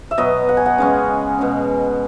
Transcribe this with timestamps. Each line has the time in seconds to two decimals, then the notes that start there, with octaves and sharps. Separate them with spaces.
0.11 E5
0.18 B2 F#3 B3 D#5
0.49 F#5
0.57 G#5
0.66 F#5
0.78 C#3 G#3 C#4
1.39 B2 G#3 C#4